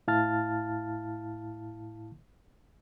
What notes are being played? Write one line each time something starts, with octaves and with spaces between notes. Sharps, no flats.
A2 E4 F5 A5 F6 A6